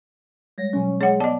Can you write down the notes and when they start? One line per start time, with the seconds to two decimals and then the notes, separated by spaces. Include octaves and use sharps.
0.58 G3 G#3 C#5 A#6
0.73 B2 F#3 C#4
1.01 G#3 C#5 F#5
1.20 B3 D5 D#5 A5